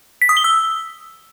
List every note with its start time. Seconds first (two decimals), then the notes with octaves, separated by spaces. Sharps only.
0.22 B6
0.29 D#6
0.37 G7
0.44 E6